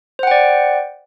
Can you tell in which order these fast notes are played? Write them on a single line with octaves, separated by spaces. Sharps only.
C5 F#5 G5 D5